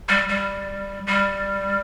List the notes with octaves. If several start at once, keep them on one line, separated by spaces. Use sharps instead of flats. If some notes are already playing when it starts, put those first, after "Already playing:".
G3
G3
G3